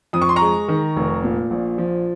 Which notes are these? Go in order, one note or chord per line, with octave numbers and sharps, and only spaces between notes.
F2 D#6
C#6
C6
A#5 C#6
G#3
D#3
F1
A#2
A#1
F3